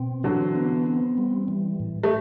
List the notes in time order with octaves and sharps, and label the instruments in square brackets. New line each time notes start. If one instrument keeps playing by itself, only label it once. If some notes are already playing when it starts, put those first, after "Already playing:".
Already playing: [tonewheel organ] B2 C4
[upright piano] D3 F#3 [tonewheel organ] E3
[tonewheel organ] B3
C4
G3
E3
A2
[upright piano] A3